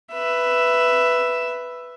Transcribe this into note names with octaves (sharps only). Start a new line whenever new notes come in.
B4 E5